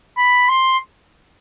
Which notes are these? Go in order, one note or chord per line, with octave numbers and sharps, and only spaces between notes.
B5
C6